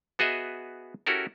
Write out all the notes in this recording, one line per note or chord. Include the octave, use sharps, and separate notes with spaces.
B3 F#4 G#4 D#5 E5
C#4 E4 F#4 G4 A4 A#4